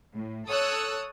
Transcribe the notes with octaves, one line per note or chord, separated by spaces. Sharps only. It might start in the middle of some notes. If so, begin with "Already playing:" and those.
A2
A4 C#5 D#6 E6 F#6